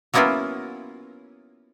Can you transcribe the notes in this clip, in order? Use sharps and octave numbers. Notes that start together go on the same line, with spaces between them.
F#3 A#3 B3 C#4 E4 F4